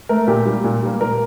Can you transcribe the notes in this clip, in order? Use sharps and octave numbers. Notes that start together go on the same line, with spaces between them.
A3 A#4
A#2 G4
G3 A#3
A#2
G3 A#3
A#2 A#4